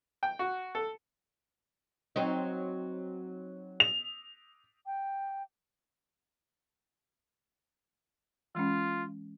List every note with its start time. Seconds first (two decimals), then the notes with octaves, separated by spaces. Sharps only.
0.23 G5
0.39 F#4
0.75 A4
2.16 F#3 C4 D#4
3.80 F7
4.86 G5
8.55 E3 G#3 C#4 F4